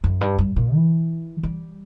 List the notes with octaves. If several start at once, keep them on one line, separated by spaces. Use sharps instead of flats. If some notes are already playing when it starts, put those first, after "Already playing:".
F#2
G2
G2
A#2
E3
G3